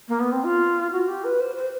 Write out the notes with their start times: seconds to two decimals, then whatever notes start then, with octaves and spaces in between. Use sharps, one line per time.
0.08 A#3
0.20 B3
0.32 C4
0.44 F4
0.92 F#4
1.08 G4
1.24 B4
1.40 C5
1.56 C5